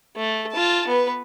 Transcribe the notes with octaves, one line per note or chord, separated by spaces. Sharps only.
A3
F4 A5
B3 B4